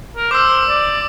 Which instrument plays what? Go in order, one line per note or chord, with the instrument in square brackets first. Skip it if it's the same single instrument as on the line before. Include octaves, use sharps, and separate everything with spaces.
[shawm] A#4
[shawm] C5 [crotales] D6 E6
[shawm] D5